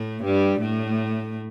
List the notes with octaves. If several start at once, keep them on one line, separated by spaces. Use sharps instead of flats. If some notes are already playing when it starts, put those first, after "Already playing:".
Already playing: A2 A3
G2 G3
A2 A3